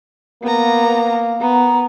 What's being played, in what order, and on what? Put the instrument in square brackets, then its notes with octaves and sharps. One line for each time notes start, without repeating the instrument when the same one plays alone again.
[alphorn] A#3 [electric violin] B3 A#5
[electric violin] B3 [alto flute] A#5